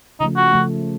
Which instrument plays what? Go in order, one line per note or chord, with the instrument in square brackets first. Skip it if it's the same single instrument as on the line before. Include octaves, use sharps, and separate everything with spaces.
[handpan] C#3 F3 A3 [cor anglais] D#4
[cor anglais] F#4
[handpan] C#3 F3 A3